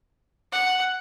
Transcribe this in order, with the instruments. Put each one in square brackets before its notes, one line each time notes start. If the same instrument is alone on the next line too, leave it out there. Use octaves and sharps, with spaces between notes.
[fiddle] F#5